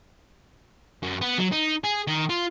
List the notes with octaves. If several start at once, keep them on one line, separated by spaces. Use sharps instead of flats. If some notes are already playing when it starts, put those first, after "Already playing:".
F#2
B3
F#3
D#4
G#4
D#3
F4